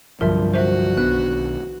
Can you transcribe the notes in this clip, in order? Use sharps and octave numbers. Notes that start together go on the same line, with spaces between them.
C2 G2 D3 F3 F#3 A#4 E5
F#4 C5 E5
B1 D#3 B3 D4 F#6